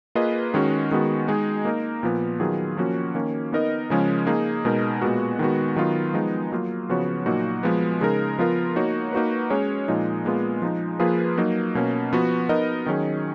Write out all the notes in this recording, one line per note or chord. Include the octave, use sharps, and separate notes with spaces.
A#3 F4 G#4 B4 D#5
D#3 G#3 C#4 F#4
D#3 G#3 B3 F#4
G#3 D#4 G#4
A#3 D#4 A#4
A#2 F3 B3
D#3 F#3 B3 F4 G#4
F3 A#3 C#4 F#4
D#3 A#3 C#4
B3 D#4 A#4 D#5
C#3 F3 G#3 C#4
A#3 D#4 G#4
B2 G#3 D#4 A#4
A#2 G#3 B3 F#4
D#3 G#3 B3 F#4
D#3 F#3 B3 F4 A#4
F3 G#3 B3 D#4
F#3 A#3 F4
C#3 F3 B3 F#4 C#5
A#2 F#3 A#3 D#4 F#4
F3 G#3 B3
C#3 G#3 D#4 A#4
F3 B3 F4 A#4
A#3 D#4 F#4 C#5
A#3 D#4 F#4 B4
G#3 C#4 G#4 C#5
A#2 F3 G#3 D#4
A#2 G#3 B3 F4
F3 G#3 D#4
F3 A#3 F4 G#4 B4
F#3 A#3 D#4
B2 A#3 C#4
F3 B3 F#4
B3 D#4 A#4 D#5
D#3 F#3 C#4 G#4